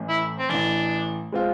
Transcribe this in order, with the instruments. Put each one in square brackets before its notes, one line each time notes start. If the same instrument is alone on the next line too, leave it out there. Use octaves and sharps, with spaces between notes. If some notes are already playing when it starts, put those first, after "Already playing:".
Already playing: [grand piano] A1 A2 E3
[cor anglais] E4
C4
[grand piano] A1 A2 E3 [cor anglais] D4
[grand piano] G#3 C4 F4